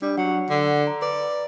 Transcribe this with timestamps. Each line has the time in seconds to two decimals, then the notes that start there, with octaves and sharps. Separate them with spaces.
0.02 G3 D4
0.18 F#3 F#5
0.50 D3
0.87 A#5
1.02 B4 D5